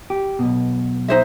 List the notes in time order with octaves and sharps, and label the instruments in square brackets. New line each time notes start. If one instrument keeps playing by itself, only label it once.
[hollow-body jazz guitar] G4
B1 B2
[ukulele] D#4 C5 E5